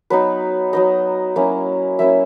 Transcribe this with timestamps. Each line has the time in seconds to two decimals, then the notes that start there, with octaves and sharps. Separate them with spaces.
0.10 F#3 B3 D#4 B4
0.73 F#3 B3 D#4 D#5
1.36 F#3 A#3 C#4 E4
1.99 F#3 A#3 C#4 E4 E5